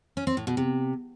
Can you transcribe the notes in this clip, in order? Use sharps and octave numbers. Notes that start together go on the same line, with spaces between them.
C#4
C4
A2
B2
C3